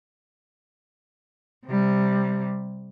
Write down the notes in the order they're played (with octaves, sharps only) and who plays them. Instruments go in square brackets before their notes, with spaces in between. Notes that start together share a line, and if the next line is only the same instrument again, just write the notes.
[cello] C3 G3